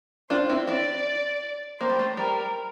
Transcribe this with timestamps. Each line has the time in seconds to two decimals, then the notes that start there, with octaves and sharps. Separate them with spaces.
0.30 D4 F4 C5
0.49 C4 E4
0.67 C4 E4 D5
1.80 A#3 C5
1.89 G3
1.99 A3
2.17 G3 A#4